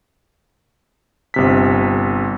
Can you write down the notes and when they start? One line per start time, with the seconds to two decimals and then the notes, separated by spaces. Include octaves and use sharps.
1.34 G1 C3 B6